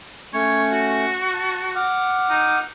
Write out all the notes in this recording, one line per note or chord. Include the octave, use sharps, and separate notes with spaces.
A3 C#4 C#5
F#4
A5
F#5 D6 F6
D#4